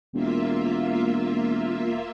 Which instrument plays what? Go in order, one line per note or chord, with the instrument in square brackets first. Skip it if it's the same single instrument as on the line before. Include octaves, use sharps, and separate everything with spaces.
[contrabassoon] E1 [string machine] A#3 F4 E5